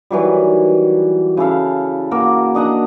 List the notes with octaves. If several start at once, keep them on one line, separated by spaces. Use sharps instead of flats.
D#3 E3 F#3 G3
C#3 E4 A4 F5
A#3 F#4 A#4 F#5
D4 D#5 F#5 A#5